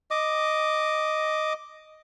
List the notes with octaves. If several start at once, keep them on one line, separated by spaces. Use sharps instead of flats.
D#5 D6